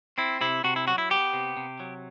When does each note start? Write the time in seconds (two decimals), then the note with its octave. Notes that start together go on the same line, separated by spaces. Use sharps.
0.18 C4 E4
0.41 C3 E4
0.64 C3 F#4
0.76 E4
0.87 F#3 F#4
0.98 E4
1.10 B3 G4
1.33 C3
1.57 C3
1.80 F#3